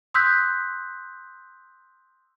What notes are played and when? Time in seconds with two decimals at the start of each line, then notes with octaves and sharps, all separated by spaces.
0.14 C6 D#6 E6 F#6 G6 B6